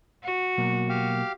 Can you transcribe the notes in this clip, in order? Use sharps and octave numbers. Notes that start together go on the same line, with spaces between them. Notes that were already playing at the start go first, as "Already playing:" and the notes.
F#4
B2 F#3 A#3
G4 F5